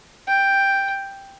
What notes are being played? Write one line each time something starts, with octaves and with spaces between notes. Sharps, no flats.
G5